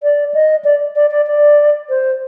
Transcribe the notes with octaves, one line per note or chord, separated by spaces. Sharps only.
D5
D#5
D5
D5
D5
D5
C5